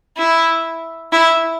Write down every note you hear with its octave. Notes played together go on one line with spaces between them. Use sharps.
E4
E4